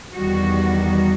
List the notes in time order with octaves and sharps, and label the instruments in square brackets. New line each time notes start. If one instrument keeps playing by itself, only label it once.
[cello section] E2 D#3 G3 F#4